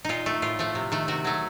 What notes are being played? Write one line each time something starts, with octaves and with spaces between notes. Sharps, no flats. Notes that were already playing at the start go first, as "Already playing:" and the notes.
A#2 D#4 F4
A3
A2 F4
F3 A3
C3
D#3 A3
C3 F#4
F#3 A3